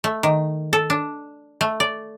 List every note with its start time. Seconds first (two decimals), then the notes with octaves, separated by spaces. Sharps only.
0.04 A3
0.23 D#3
0.73 A4
0.90 D4
1.61 A3
1.80 D5